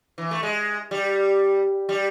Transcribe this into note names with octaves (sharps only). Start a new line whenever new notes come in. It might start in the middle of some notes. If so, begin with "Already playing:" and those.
E3
A3
G#3
G3
G3